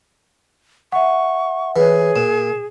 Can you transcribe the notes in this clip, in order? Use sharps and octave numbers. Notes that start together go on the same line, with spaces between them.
E5 F#5 C#6
E3 G#4 B4 C#5
A#2 E7